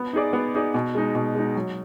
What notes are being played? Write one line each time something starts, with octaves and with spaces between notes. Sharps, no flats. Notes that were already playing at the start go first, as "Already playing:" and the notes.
Already playing: B3
D#4 G#4 D5
B3
D#4 G#4 D5
B2
G#3 D#4
B2
G#3 D#4
F#3